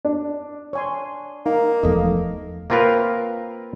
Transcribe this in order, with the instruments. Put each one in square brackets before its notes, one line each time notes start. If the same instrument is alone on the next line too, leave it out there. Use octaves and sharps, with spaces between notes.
[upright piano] D4
[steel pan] C#5 G#5 C6
[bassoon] A#3 [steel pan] D#4
[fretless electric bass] E1 E2 F3 [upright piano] A3 [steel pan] D#5
[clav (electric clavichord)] A#3 C4 F4 A#4 B4 F5